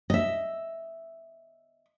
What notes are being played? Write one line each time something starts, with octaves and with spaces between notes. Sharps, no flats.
D#5 E5